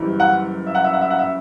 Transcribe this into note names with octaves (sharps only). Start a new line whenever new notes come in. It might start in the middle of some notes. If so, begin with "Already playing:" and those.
Already playing: F#1 F#2 E3 G3
F#5
E5
F#5
E5
F#5
E5
F#5
E5